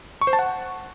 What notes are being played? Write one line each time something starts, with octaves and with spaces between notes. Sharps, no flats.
C#6
C5
A5
F#5